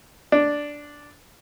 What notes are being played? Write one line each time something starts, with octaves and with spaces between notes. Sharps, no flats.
D4